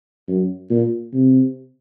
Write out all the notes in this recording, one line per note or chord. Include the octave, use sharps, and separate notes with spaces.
F#2
A#2
C3